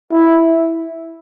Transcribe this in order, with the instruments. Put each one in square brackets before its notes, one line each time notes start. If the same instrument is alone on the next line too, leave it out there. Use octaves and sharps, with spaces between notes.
[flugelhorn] E4